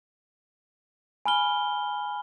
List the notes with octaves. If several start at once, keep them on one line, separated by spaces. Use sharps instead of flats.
G#5 B5 F6 G7